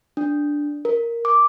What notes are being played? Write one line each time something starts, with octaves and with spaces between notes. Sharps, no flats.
D4
A#4
D6